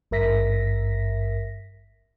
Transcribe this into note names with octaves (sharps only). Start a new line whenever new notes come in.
G#1 G2 A#4 E5 A#6 B6